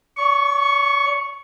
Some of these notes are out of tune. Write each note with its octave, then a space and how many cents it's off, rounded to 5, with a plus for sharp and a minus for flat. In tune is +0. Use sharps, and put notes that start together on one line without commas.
C#5 +45 C#6 +0